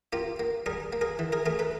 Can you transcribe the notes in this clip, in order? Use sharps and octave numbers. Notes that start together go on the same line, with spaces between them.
A#3 F4 G4
A#3
G3 G#4 A#4
A#3
G#4 A#4
E3
G#4 A#4
A3 G#4 A#4
A4 B4